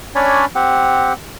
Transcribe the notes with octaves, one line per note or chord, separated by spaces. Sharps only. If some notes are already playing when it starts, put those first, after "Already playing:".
C#4 D4 C#5 D5 G#5 B5
C4 G4 F#5